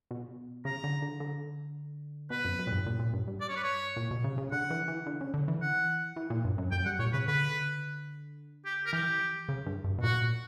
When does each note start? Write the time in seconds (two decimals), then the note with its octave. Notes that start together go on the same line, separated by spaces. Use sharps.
0.11 B2
0.65 C#3 A#5
0.84 D3
1.02 D3
1.20 D3
2.30 B2 B4
2.45 F#2
2.59 F#2
2.67 A#2
2.72 G2
2.86 A#2
2.99 A#2
3.13 G2
3.28 G2
3.41 D5
3.49 C#5
3.56 B4
3.63 C#5
3.96 A#2
4.11 B2
4.24 C#3
4.38 C#3
4.52 D3 F#5
4.70 E3
4.88 E3
5.06 D3
5.21 C#3
5.34 D3
5.48 E3
5.62 F#5
6.16 E3
6.30 A#2
6.45 G2
6.58 F#2
6.72 F#2 G5
6.85 G2 F#5
6.99 A#2 C#5
7.13 C#3 B4
7.27 D3 B4
8.65 G4
8.86 A#4
8.93 E3 G4
9.49 C#3
9.66 G2
9.84 G2
9.98 B2
10.03 A#2 F#4